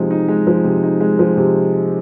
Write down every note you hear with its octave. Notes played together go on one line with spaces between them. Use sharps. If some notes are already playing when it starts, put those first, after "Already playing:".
Already playing: C3 F3 G#3 D#4
D#4
G#3
F3
C3
D#4
G#3
F3
C3